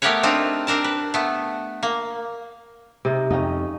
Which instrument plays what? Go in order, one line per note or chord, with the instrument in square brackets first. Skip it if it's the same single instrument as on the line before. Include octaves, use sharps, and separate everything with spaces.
[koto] A3 B3 G4 A#4 B4 C#5
C4 D4 D#4 F4
C4 D4 A#4 A5
B4
A3 B3
A#3
[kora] C3 D#4
[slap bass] F2 [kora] C#4 D#4